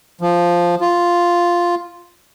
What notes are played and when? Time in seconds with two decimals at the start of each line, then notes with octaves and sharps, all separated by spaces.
0.21 F3
0.81 F4